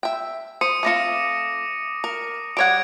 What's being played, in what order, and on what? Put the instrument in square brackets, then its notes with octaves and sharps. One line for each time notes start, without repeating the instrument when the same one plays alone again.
[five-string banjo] E5 G5
[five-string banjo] C5 [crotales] D#6 C#7 D#7
[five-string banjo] A3 C4 F4 [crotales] D6 A#6 C#7
[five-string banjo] A#4
[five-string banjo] G3 C#5 F#5 [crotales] G#6 D7